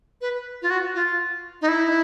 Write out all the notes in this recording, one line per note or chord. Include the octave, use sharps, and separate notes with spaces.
B4
F4
F#4
F4
D#4
E4